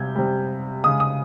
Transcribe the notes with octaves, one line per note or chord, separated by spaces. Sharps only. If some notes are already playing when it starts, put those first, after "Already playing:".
Already playing: C3 G3 G6 G#6
C3 G3
C#3 G#3 D#6
D#6